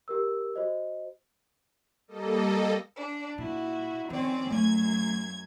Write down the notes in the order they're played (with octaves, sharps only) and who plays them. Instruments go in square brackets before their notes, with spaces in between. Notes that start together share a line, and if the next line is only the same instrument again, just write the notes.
[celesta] G4 A#4 E6
F#4 C5 D#5
[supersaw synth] G3 A#3 A4 D#5
[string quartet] D4
[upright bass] A#2 [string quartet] E4 F#4
[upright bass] F2 D#3 [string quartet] C4 C#4 D5
[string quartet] F#2 G#6 [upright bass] A3